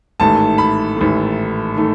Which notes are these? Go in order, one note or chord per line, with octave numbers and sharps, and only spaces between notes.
A1 G#2 D#3 A3 A5
B5
A1 G#2 D#3 A3
D#3 A3